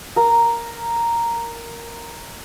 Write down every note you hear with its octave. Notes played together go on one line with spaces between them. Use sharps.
A#4 A#5